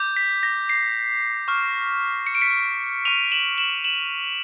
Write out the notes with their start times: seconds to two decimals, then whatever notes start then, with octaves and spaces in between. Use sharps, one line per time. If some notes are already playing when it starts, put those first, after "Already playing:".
Already playing: D6 G6
0.17 B6
0.43 A#6
0.69 C7
1.48 C#6 F6
2.27 C#7
2.35 D7
2.41 B6 C#7
3.05 C#6 F6 D#7 F7
3.32 E7 F#7
3.58 E7 F#7
3.84 E7 F#7